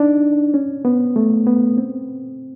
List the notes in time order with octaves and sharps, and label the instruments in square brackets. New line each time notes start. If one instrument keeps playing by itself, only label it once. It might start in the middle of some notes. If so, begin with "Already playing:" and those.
Already playing: [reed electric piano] D4 D#4
C#4
B3
A3
B3
C4